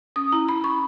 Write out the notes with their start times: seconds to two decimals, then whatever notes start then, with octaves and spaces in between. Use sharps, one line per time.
0.16 C#4 D#6
0.32 E4 A#5
0.48 E4 B5
0.64 C#4 C#6